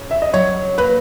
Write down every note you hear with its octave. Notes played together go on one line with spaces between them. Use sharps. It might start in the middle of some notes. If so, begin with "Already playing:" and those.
Already playing: C#3
E5
D#5
F#3 C#5
A#3 B4